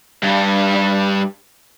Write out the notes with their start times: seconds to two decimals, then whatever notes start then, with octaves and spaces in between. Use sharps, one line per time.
0.23 G2 G3